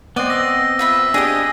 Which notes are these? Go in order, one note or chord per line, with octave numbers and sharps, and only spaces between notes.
B3 C4 D5 D#5 F#5
E6 A#6
F4 B4 E5 E6
D4 G4 G#4 D#5 D#6 A#6